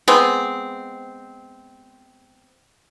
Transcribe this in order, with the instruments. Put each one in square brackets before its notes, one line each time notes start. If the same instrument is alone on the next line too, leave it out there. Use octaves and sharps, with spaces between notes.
[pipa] G#3 B3 C4